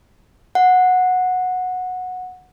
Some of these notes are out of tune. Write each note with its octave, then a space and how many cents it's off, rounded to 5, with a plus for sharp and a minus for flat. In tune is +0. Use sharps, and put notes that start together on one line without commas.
F#5 -15